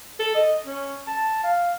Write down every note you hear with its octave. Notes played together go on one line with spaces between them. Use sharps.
A4
D#5
C#4
A5
F5